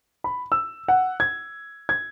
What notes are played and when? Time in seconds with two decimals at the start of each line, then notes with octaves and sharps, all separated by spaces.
0.24 B5
0.52 E6
0.88 F#5
1.20 G#6
1.89 G#6